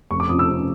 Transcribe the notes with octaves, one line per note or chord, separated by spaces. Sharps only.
F1 C#6
D6
F2 C3 F3 D#6
E6
F1